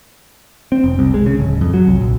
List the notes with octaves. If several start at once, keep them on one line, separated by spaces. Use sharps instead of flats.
C4
F1
C2
G#3
C#3
D1
F2
F#3
C2
A#1